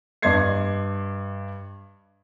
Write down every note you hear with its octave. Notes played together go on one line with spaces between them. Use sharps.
G2 D5 D#5 C6 G#6 C7